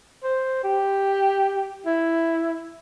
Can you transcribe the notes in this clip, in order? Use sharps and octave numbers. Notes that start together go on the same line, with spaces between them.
C5
G4
E4